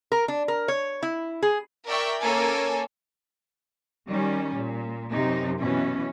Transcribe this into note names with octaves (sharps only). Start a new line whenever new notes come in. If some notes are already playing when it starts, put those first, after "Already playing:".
A#4
D4
A#4
C#5
E4
G#4
A#4 D5 E5 G5 C#6 E6
A#3 C#4 A4 A#4 G#5 G#6
D#3 G3 C#4
A#2
F#2 C3 D#4
B2 E3 C#4